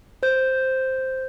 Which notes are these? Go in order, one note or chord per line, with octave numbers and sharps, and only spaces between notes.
C5 G6